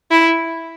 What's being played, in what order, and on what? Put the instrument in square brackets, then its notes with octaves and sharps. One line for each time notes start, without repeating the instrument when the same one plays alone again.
[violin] E4